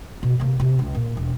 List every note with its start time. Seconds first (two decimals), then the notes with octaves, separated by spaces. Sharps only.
0.23 B2
0.40 C3 A#3
0.60 C3 C4
0.79 C#2
0.95 A#2
1.17 E1